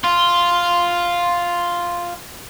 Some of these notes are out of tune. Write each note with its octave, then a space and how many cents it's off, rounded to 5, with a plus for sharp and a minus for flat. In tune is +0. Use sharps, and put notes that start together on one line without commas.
F4 +0 C6 +0